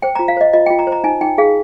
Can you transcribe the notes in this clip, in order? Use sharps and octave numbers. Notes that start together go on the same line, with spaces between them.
C5 G5
A#5
F4
F5
C5 D#5
F4 D#5
G5
F4
A#5
C5
A#5
D#4 G#5
D#4 G5
G#4 F5